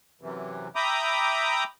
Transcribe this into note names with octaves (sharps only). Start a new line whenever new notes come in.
F#2 C3 E3
E5 G5 A#5 B5 D6 D#6